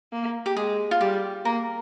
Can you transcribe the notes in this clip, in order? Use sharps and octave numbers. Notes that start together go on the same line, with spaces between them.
A#3
G4
G#3 G#4
F4
G3 G4
A#3 A#4